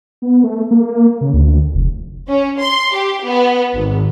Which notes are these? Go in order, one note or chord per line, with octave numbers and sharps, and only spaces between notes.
B3
A3
A#3
C#3
D2
F1
C#4
C6
G4
B3
G#1